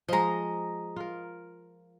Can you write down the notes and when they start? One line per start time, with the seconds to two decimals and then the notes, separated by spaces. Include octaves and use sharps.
0.09 F3 G#3 D#5 A#5
0.96 F4 A#4